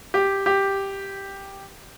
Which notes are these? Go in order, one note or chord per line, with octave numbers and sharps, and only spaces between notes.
G4
G4